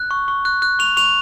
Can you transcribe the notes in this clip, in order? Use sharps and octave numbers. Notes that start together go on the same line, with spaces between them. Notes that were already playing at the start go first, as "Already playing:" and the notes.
Already playing: F#6
C#6
C#6
F#6
F#6
C#6 F7
C#6 F7